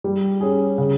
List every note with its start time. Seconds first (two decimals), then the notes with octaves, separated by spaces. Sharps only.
0.04 G3
0.41 C#4 G#4
0.78 C#3